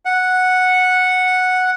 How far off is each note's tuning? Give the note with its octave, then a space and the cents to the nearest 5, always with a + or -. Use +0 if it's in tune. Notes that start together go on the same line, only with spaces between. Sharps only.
F#5 -5